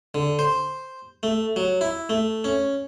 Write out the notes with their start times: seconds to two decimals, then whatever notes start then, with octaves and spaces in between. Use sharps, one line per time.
0.15 D3
0.39 C5
1.23 A3
1.56 F#3
1.81 E4
2.09 A3
2.44 C#4